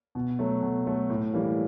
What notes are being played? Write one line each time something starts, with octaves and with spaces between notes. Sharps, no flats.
B2
F#3 A3
B2
F#3 A3
A2
E3 G3 A#3